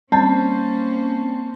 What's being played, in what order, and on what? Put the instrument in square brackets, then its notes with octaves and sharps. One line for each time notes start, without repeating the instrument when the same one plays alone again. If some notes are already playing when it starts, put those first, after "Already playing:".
[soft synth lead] G3 [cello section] A#3 C#4 C5 [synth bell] C4 [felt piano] A5